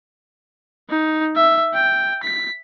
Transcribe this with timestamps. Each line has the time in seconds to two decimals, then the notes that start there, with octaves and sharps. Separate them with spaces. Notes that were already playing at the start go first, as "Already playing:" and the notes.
0.89 D#4
1.36 E5
1.74 G5
2.23 B6